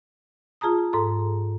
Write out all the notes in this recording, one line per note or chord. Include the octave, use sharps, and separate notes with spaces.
F4 G#4 A5 A#5 D#6
G#2 A4 A#5